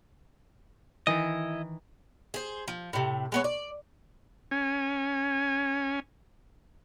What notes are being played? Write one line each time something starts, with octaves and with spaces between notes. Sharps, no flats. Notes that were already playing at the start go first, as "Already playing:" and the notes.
D#3 E3 D#4 E4 D#5
G#4 C5
F3
A2 C3
G#3 B3 C#5
D5
C#4 G#5